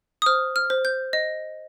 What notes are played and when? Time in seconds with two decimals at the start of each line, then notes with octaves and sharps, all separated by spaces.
0.22 D#6
0.26 C5 F6
0.56 F6
0.70 C5
0.85 G6
1.13 D#5